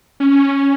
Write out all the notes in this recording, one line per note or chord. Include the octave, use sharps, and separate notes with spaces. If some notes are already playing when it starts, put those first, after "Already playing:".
C#4